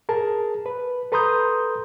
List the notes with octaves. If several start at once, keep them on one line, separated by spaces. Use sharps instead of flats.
G#4 A#4 A5
B4
A4 B4 A#5 C6 D#6 G6